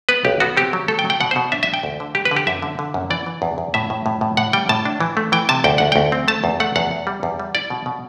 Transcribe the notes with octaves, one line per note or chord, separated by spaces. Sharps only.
B3 B4
B1 G4
B3 F#4
C4 G4
F#3
A3 A4
G5
F#3
G5
B2 F#5
C5
B2
D4 E5
E5
D4
G5
D2
D3
G3 G4
B4
D3
G4
F#2 E5
D3
D3
F#2
E3 D5
E3
E2
E2
A2 E5
A2
A2
A2
A2 F#5
G3 G5
A2 A5
D4
E3
A3
E3 G5
C3 A5
D2 G5
D2 F#5
D2 G5
C4
A3 A5
E2
A3 F#5
E2 F#5
E2
G3
E2
G3
E4 D5
B2
B2